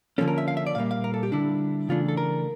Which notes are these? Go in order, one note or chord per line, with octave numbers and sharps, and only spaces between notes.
D3 F3 A#3 C#4 A4
A#4
E5
F5
E5
D5
A#2 G3 A#3 F5
F5
A#4
A4
G4
D3 G3 D4 E4
C#3 E3 A3 D4 F4
A4
A#4